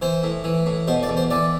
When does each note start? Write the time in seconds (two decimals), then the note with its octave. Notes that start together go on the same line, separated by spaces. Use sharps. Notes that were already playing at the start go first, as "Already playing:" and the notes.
0.02 E3 C5
0.23 A2
0.44 E3
0.66 A2
0.88 B2 C5
1.03 D5
1.09 E2
1.17 C5
1.30 E3 D5